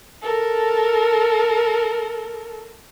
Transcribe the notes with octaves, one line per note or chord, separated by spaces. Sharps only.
A4 A#4